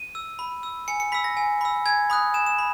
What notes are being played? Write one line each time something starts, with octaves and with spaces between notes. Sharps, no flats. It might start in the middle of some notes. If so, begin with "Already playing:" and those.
Already playing: D#7
E6
B5
E6
G#5 C#7
C#7
B5 E6 B6
A#6
G#5
B5 E6
G#5 G#6
B5 D#6 F#6
G#5 E7
E7
B5